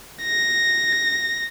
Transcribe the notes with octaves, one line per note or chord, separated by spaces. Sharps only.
A#6